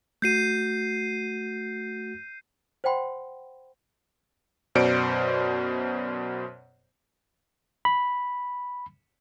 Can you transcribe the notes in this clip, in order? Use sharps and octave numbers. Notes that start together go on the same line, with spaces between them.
A3 F#4 G6 C7 D#7
C5 D5 F#5 G5 B5 C6
F#2 B2 C5 D5 C#7 D7
B5